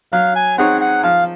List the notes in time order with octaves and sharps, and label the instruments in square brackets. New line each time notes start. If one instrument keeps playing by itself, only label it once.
[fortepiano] F#3 [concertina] F5
[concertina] G#5
[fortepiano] C4 D#4 G#4 C#5 [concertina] F#5
[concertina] F#5
[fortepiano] F3 [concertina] F5